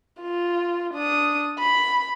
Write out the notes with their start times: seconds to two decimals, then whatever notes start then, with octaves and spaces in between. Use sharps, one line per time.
0.21 F4
0.94 D4 D#6
1.59 B5